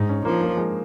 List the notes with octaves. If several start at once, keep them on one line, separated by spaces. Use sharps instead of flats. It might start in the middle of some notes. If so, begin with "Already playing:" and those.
Already playing: G#2 D#4
C#4
F3 A#3
A#3
G#3